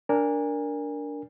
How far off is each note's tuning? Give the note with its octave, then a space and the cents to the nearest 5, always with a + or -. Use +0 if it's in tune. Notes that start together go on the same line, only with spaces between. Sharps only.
D4 -10 A#4 +0 G#5 -30